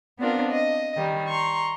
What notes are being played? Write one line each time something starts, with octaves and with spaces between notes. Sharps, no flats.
B3 C4 D4 F4 A#4
D#5
D#3 G3
A#5 C6 C#6